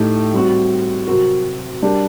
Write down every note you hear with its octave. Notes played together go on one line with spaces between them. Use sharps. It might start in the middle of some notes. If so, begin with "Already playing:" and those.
Already playing: A2 A3 D#4 G4
G3 C4 F#4
C3 F#3 C4 F#4 A#4
G3 D4 G4 A#4